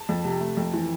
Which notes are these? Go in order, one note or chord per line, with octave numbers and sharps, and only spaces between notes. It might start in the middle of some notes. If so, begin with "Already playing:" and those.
Already playing: A5
F2
C3
A3
F2
E3